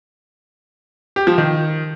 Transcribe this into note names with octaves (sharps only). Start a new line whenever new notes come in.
G4
F3
D#3